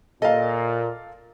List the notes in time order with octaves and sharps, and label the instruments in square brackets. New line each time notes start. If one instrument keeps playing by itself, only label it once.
[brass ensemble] A#2 [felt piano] A4 F5 [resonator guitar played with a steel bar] D#5